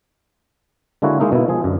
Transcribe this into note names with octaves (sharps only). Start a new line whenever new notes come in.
D3 G#3 A#3 E4 F#4 C#5
G#3 A#3 D#4 E4 A#4
B2 A#3 E4
F3 G#3 G#4
F#2 D3